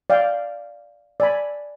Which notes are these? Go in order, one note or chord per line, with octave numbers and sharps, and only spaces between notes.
D5 F5 G5
D5 G#5 B5